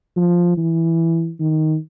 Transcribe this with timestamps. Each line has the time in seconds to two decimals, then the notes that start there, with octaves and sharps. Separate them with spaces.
0.17 F3
0.58 E3
1.40 D#3